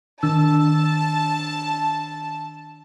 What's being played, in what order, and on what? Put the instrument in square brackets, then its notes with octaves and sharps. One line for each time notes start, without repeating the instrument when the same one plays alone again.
[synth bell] D#3 D4 E6 [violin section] A5